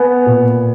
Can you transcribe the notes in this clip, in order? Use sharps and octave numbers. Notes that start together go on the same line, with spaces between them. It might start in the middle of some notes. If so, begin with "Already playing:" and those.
Already playing: B3 G#5
A#2